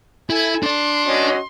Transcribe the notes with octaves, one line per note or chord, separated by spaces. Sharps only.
E4 A4 G#5
D4 D5 C6
C#4 F#4 D#5